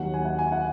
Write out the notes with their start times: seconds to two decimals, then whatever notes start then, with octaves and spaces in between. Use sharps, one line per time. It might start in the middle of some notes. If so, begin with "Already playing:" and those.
Already playing: D#2 D#3 F#3 F#5
0.14 G#5
0.25 F#5
0.39 G#5
0.52 F#5